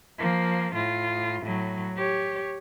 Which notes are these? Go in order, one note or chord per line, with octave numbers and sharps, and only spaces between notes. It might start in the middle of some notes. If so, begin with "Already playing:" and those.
F3 A#3
A2 F4
A2 F#3
G4 C#5